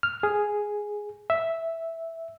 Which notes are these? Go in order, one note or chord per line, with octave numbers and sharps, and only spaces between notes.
F6
G#4
E5